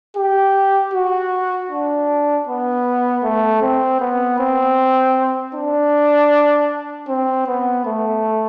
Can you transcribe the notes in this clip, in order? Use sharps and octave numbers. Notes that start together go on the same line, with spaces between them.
G4
F#4
D4
B3
A3
C4
B3
C4
D4
C4
B3
A3